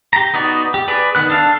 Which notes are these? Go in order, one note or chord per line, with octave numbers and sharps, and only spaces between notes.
G4 A#5
B3 D#4 F#4 D5
G4
G#4 B4 D5
D#3 B3 F#6
D4 A4 F5